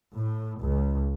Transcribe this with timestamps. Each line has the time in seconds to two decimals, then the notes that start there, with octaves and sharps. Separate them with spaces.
0.16 A2
0.63 C#2